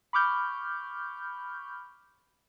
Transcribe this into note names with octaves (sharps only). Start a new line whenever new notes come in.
B5 C#6 D6 F6 G6